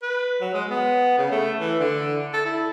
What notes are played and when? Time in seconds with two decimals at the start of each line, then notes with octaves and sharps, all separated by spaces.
0.02 B4
0.41 F#3
0.54 G#3
0.70 B3
1.18 C#3
1.31 A3
1.60 E3
1.80 D3
2.34 A4
2.46 E4